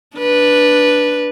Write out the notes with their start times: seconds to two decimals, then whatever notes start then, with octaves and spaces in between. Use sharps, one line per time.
0.17 D4 B4